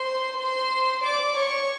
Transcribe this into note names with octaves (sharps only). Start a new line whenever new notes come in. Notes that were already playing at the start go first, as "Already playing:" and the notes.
Already playing: C5 C6
C5 C6
D5 D6
C#5 C#6